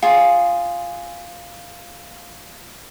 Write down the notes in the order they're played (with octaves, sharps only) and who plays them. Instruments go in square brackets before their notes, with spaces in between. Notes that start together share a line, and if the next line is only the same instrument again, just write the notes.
[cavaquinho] F4 G#4